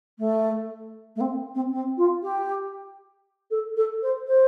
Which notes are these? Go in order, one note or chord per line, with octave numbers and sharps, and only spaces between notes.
A3
A3
C4
C4
C4
F4
G4
A4
A4
C5
C5